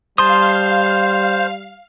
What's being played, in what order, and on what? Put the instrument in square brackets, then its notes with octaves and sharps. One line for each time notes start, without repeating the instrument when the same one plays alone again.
[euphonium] G3 [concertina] C5 [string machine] F5 [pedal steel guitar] A5 C6 D#6